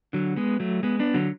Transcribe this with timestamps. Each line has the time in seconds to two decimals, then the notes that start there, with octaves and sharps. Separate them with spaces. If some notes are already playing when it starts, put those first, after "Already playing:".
0.13 D3 F#3
0.36 G#3 B3
0.60 F#3 A3
0.83 G#3 B3
0.99 B3 D4
1.14 D3 F#3